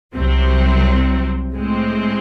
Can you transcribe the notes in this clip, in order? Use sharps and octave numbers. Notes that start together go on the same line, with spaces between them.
C2 C3 F#3 C4
A2 G#3 C4